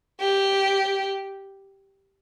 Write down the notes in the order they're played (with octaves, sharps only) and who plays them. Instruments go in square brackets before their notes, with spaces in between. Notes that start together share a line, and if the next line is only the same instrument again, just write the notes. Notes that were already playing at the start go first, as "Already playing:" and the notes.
[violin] G4